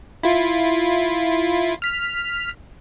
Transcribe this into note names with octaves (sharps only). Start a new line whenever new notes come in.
E4 F4
F6 B6